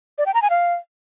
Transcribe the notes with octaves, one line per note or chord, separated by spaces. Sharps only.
D5
G5
A#5
G#5
F5